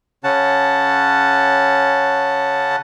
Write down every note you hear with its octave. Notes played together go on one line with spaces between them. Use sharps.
C#3 C#4 F#5 A5